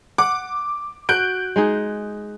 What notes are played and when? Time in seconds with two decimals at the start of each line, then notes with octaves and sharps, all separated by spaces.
0.18 F#5 D6
1.09 F#4 F#6 G6 D7
1.56 G#3 D#4 G#4